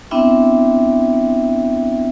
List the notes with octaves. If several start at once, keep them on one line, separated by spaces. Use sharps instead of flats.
B3 C4 D4 E4 E5 G5